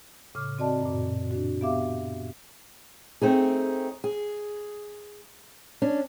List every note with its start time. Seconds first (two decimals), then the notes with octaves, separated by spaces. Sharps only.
0.35 A2 C#3 D6 F6
0.58 C4 F#4 D5 D#5 A5
0.82 F#2 A#2
1.31 D4 F#4
1.61 B3 G4 E5 F5 D6
3.21 A3 C4 D#4 G#4
4.04 G#4
5.82 C#4 D4